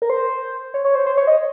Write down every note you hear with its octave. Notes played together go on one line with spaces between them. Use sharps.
A#4
C5
C#5
C#5
C5
C5
C#5
D#5